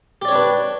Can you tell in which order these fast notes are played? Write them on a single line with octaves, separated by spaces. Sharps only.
G4 D5 C#5 D4 B4